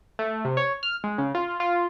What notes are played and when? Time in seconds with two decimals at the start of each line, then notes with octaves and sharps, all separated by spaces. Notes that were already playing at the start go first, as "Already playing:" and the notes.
0.19 A3
0.45 C3
0.57 C#5
0.83 F6
1.04 G#3
1.18 C#3
1.35 F4
1.60 F4